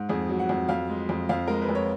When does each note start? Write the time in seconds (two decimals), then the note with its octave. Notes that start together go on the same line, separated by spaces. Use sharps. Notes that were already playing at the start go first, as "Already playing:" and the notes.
Already playing: G#2
0.09 F2 G#4
0.29 F#3
0.39 F#5
0.49 F2
0.69 F2 F5
0.89 G#3
1.09 F2
1.29 F2 F5
1.48 G#3 A#4
1.62 B4
1.69 F2
1.75 C#5